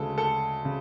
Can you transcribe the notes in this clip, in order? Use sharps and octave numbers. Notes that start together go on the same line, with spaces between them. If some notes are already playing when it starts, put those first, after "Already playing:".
Already playing: D2 C#3 G#3 A4
A4
C#3